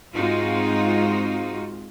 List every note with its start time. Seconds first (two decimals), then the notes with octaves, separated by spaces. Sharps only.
0.14 G#2 G#3 C4 D#4 F4 F#4